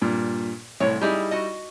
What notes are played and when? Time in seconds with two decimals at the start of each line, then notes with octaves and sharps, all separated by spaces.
0.02 G2 A#2
0.80 C2 A2 C#5
1.01 G3 D#4 E4 G4 G#4
1.31 F#4 D#5